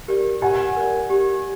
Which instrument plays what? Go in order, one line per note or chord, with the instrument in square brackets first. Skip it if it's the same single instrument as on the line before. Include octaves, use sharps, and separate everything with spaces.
[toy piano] G4 A#4 D5
[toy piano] G4 [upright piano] F#5 G#5
[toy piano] A#4 D5
G4